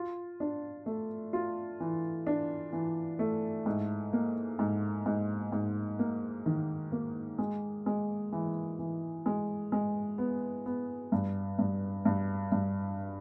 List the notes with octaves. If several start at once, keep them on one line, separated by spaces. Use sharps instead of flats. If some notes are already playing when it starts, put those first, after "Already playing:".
Already playing: F4
D4
A3
F4
E3
D4
E3
A3
G#2
A#3
G#2
G#2
G#2
A#3
D#3
A#3
G#3
G#3
E3
E3
G#3
G#3
B3
B3
G2
G2
G2
G2